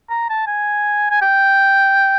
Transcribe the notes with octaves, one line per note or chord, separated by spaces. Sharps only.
A#5
A5
G#5
G#5
G5